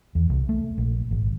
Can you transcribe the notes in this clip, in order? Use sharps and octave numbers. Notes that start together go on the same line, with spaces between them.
E2
C2
A3
A#1
G#1